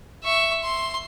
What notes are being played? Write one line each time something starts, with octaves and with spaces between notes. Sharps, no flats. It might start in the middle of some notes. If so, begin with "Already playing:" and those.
E5 C#6
C6